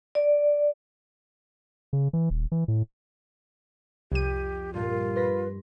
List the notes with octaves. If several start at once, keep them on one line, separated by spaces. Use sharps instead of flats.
D5
C#3
E3
D#1
E3
A2
C2 F2 G4 D#7
G2 A#2 F4
B4 C6 A#6 B6